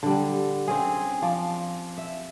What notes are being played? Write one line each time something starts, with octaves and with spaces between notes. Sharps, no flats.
D3 G3
C4 C#4 G#4
F3 D5
E5